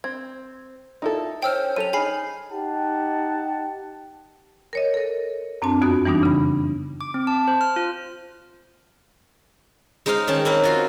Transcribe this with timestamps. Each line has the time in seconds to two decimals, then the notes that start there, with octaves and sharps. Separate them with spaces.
0.04 C4 G#6
1.02 A#2 D#4 E4 A4
1.42 C#4 C5 G5 E6 F6
1.76 F#3 G4 A4 D#7 F7
1.93 D#4 G#4 G#5 B5 F6 C7
2.53 D#4 G4 F#5 A5
4.73 A#4 C#5 D#5
4.94 A4 A#4
5.62 F#2 C4 D4 A5
5.82 F2 B3 F#4 D#6
6.05 E3 G3 B3 D4 D#4
6.23 C#3 B5
7.01 D6
7.14 C4
7.27 A5
7.48 C5
7.61 F6
7.76 F4
10.06 G#3 D#4 C5 D#5 F5
10.27 D#3 C#4 G5 A5
10.45 A#3 C4 D#4 B4 F5
10.63 F4 F#4 C6